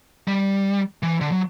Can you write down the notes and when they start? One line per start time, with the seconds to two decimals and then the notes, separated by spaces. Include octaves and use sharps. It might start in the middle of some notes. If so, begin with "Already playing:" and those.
0.28 G3
1.03 E3
1.21 D3
1.32 F#3